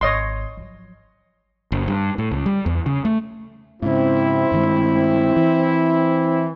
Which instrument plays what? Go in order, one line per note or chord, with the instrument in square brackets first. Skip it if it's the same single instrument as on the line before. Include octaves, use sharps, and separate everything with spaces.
[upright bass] G#1 [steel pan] C#5 D#5 C6
[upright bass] F3 F#3
[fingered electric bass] F#1
G2
A2
C#2
G3
E2
C#3
A3
[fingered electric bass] G#2 C#3 [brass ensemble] C4 E4
[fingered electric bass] G2 D#3 G#3
E3